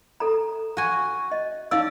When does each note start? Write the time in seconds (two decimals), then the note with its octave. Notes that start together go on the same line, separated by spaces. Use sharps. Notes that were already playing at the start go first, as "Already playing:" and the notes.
0.20 A4 A#5
0.77 F#4 G#5
1.32 D#5
1.71 D#4 D5 F5 E6